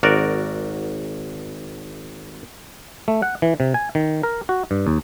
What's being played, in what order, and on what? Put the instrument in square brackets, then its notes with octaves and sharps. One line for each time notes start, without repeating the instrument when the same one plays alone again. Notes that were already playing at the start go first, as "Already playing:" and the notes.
[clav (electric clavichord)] G#1 F#4 A#4 D5
A3
F#5
E3
C3
G#5
D#3
A#4
F#4
G2
D#2